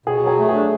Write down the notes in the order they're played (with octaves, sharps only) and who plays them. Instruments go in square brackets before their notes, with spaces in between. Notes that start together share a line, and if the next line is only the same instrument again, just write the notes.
[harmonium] B2 [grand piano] G#4
[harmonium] F#3 [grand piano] G#4
[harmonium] A3
[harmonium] D4 [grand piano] G#4